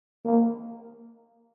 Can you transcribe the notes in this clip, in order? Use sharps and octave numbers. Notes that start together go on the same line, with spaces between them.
A#3